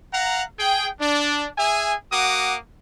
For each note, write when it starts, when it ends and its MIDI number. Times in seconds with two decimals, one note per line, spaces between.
0.13 0.43 77
0.13 0.43 78
0.13 0.43 82
0.59 0.88 68
0.59 0.88 79
1.00 1.48 62
1.58 1.94 68
1.58 1.94 76
1.58 1.94 80
2.12 2.56 58
2.12 2.56 66
2.12 2.56 78
2.12 2.56 86
2.12 2.56 87